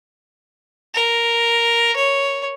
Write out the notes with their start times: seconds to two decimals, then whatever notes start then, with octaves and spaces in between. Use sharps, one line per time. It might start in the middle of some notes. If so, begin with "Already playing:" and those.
0.94 A#4
1.96 C#5